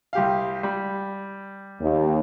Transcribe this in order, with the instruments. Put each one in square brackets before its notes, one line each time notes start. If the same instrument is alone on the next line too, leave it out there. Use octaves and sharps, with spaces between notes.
[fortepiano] C2 G4 F5
G3
[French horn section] D#2